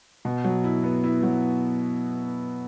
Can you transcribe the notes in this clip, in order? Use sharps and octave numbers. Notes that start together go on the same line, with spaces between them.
B2
F#3
E4
B3
E4
F#3